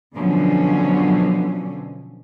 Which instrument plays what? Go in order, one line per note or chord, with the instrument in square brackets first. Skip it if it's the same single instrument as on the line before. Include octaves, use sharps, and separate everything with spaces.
[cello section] B2 D3 F3 F#3 C#4